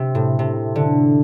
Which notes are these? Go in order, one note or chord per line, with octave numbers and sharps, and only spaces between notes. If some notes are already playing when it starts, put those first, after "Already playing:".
Already playing: C3
A2
C3
D3